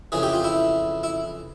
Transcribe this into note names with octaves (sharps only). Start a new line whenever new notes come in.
F2 C#3 E3 G#4
G4
F4
E4
E4